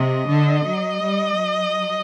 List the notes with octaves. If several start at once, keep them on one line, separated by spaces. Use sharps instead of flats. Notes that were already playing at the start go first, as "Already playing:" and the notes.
Already playing: C3 D#5
D3
F#3
G3
F#3